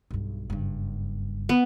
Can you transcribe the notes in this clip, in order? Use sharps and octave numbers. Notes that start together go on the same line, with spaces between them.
B1 G2
F#1 G2
B3